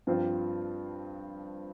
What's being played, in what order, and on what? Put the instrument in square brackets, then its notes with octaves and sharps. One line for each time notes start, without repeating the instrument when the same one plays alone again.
[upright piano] G2 F3 C4 F4